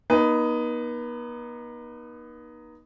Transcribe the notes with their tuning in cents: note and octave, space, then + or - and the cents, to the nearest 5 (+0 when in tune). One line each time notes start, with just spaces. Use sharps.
B3 -45 D#4 +0 B4 +20